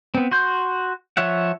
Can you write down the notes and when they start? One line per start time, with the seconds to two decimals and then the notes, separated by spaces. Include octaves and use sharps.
0.15 B3 C4
0.31 F#4 C6 G6
1.17 F3 C#5 E5 F#5